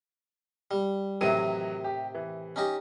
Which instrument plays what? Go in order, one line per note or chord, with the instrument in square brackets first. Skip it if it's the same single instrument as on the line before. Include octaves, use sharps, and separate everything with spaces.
[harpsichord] G3
[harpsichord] A2 C3 D#3 [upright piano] E3 F#3 D#7
[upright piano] G4
E3
[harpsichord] C#4 D#4 G4